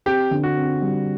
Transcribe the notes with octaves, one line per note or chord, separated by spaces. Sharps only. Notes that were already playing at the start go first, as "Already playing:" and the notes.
C4 G4
D3
F#4
C4
G3